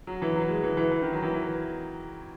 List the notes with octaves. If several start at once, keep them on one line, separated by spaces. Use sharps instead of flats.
F#3
E3
F#3
G#3
E3
E3
E3
D#3
F#3
E3
E3